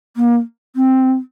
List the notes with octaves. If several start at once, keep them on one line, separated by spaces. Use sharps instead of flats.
A#3
C4